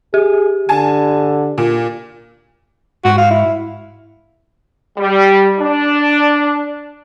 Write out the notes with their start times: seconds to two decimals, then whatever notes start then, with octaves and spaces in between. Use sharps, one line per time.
0.14 G4 G#4
0.69 D3 G#5 A5
1.58 A#2
3.05 G#2 F#4
3.18 F5
3.31 E4
4.98 G3
5.60 D4